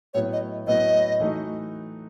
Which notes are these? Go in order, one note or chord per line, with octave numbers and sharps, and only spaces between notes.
A2 F#3 B3 E4 C#5
D#5
A2 F#3 B3 E4 D#5
E3 A3 D#4 F#4